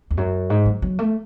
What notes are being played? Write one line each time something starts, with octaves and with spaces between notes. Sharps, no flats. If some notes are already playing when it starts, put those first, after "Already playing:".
E2
F#2
G#2
F#3
F#3
A3